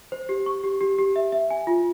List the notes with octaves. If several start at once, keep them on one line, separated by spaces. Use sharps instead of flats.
C5
G4
C#6
G4
G4
G4
E5
E5
G#5
F4